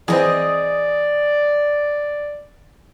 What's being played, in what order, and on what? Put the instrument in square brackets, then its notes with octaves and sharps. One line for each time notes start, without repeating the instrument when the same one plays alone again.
[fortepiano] E3 C4 [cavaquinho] G#4 D#5 [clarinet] D5